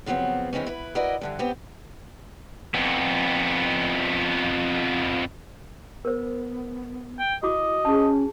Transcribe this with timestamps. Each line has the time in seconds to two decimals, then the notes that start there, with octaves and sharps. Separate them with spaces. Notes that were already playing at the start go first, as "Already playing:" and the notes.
0.06 C#3 F3 F#3 B3 C4
0.53 D#3 E3 G#3 C4 C#4
0.66 E4 B4
0.95 E4 F#4 A#4 B4 D5 D#5
1.21 G2 D3 E3
1.39 B3 C4 G4
2.74 F2 B3
6.05 B3 A#4 C5
7.19 G5
7.43 E4 F#4 D#5 D6
7.85 C#4 G#4 A5